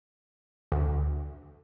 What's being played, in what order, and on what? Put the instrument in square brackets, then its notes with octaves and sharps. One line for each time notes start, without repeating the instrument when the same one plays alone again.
[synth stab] D2